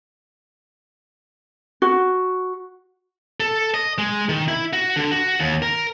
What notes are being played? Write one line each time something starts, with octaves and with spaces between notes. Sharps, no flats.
F#4
A4
D#5
G#3
D#3
E4
F#4
D3
F#4
D#2
A#4